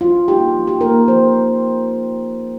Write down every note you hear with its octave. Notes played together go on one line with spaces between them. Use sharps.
F3 F4
A#3 D#4 G4
F3
G4
A#3 D#4 A#4
F3 C5